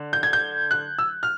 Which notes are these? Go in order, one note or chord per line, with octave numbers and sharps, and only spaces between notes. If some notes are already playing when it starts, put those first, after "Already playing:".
Already playing: D3
G6
G#6
G6
F#6
E6
F6